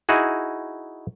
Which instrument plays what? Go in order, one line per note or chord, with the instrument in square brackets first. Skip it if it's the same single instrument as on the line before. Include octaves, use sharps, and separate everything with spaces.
[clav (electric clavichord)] D#4 E4 F#4 G#4